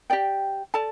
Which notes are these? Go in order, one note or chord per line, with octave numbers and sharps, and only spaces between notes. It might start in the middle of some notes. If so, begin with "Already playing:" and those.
G4 D5 G5
A4 D5 A5